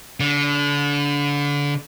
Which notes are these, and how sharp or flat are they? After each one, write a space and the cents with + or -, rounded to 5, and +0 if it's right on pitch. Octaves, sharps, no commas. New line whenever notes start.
D3 -30